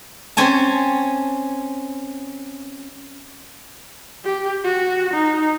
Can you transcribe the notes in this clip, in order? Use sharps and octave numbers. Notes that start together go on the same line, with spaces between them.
C4 C#4 G#5 A5
G4
F#4
D#4